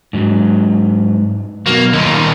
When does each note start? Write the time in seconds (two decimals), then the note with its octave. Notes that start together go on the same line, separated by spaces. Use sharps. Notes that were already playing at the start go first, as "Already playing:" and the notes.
0.13 G#2 F#3
1.66 B2 F#3 A#3 F#4
1.93 D#2 A#2 D#4